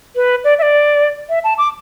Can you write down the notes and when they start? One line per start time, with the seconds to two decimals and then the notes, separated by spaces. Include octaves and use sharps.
0.16 B4
0.44 D5
0.59 E5
0.62 D5
1.29 E5
1.44 A5
1.58 D6